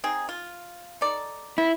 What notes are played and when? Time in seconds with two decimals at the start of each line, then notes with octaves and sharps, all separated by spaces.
0.04 C4 D#4 G#4
0.29 F4
1.01 D#4 A4 D5
1.58 B3 E4